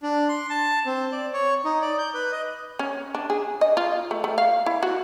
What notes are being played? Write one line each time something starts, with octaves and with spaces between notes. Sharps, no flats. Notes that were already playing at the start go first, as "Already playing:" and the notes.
D4
C6
A5
C4
D5
C#5
D#4
D5
G6
B4
D#5
C#4
D4
G#4
D#5
F4
A3
A3
F5
E4
F#4